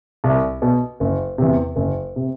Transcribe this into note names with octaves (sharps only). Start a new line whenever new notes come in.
C2
B2
F#1
E2 C3
F#1
C3